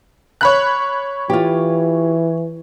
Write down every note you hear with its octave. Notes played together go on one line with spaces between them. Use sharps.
C#5 B5 F#6
E3 F4 G4